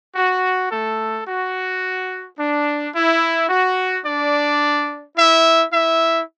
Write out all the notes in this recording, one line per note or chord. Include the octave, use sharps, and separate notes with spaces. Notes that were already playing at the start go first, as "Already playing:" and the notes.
F#4
A3 A4
F#4
D4
E4
F#4
D4 D5
E4 E5
E4 E5